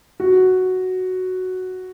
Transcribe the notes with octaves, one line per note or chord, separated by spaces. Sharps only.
F#4